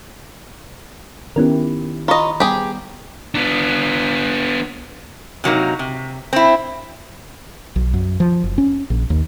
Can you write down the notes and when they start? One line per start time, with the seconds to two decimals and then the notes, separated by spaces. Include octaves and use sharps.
1.36 D#3 B3 C#4 E4 G4 A#4
2.08 F4 D#5 A#5 B5 C#6
2.40 G3 B3 G4 G#4
3.35 B3 D4
5.44 C3 F#3 A#3 D#4
5.79 C3
6.33 C4 E4
7.76 B1
7.94 F#2
8.20 F3
8.44 F#1
8.58 C#4
8.90 A#1
9.10 D#2